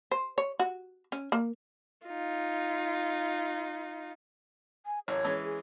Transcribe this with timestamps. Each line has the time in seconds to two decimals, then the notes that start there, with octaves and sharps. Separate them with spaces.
0.11 C5
0.38 C#5
0.59 F#4
1.12 C#4
1.32 A#3
2.06 D#4 F4
4.86 G#5
5.08 A1 F#2 C#5
5.24 E3 G#3 C#4
5.43 G#4